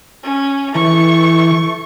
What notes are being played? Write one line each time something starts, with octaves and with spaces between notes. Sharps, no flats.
C#4
E3 A3 C#6